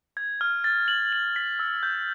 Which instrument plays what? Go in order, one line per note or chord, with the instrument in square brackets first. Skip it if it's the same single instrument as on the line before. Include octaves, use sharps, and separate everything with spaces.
[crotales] G#6
F6
A6
F#7
F#7
B6
E6
G6